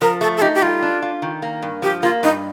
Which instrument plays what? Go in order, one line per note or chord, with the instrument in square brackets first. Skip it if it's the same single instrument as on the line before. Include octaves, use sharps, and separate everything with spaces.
[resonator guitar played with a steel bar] F3 [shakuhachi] A#4
[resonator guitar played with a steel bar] A3 [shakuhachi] A4
[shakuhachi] A4
[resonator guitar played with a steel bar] D#4 [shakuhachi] G4
[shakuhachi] G4
[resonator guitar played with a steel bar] G3 [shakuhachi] F4
[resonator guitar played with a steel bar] D4
F4
D#3
A#3
G2
[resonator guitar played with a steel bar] F3 [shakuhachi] G4
[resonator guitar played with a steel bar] A#3 [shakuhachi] F4
[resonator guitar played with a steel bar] G2 [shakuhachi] D#4